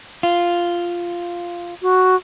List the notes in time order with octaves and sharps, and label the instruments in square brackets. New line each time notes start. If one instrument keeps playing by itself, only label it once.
[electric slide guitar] F4
[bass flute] F#4